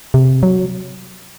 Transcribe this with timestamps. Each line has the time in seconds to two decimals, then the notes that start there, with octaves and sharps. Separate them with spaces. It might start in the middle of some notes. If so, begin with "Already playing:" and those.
0.14 C3
0.43 F#3